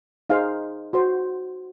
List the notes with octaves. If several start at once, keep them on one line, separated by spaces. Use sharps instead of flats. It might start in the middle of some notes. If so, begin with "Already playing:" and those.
D#4 G#4 C5 F5
F#4 C5 C6